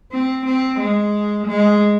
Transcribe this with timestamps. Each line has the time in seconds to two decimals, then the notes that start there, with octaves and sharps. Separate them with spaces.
0.12 C4
0.46 C4
0.80 G#3
1.47 G#3